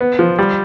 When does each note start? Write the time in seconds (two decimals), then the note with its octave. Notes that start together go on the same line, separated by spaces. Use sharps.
0.01 B3
0.19 F3
0.39 G3